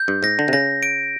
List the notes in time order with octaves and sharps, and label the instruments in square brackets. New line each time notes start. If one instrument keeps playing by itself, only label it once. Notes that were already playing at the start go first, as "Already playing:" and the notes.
Already playing: [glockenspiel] G6
[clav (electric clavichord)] G2
[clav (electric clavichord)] G#2 [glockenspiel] A#6
[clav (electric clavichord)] D3
C3
[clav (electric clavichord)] C#3 [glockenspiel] A#6
[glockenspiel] D7